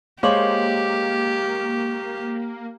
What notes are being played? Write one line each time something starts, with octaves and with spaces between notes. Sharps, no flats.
G#3 A#3 G4 C5 C#5 F5 D6 F#7